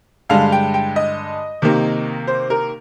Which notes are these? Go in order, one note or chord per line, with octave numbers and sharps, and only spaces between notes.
G2 D3 G#3 F5
G5
G5
D#5
C3 D#3 A#3
C5
A#4